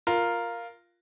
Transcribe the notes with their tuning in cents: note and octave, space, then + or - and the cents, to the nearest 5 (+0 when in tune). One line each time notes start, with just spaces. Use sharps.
F4 +0 A#4 +0